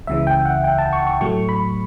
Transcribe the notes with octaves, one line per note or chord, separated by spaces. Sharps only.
C#2 C#3 E3 E5
G5
F#5
G5
A5
C#6
C#6
A2 F#3 A3 C#6
B5